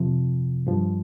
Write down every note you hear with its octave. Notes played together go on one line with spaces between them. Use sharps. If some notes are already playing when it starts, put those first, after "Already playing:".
Already playing: F2 C3 F3
G2 F3